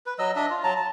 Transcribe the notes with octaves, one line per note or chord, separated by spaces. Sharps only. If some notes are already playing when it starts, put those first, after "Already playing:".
B4
F#3 D#5 E6
D4 D#5 E5
F4
F#3 A5 A#5
A5